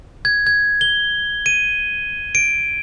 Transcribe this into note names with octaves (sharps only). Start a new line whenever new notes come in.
G#6
G#6
G7
D#7
D7